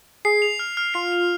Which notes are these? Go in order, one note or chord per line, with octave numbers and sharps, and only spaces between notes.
G#4 C7
F7
F6
F6
F4 C7
F7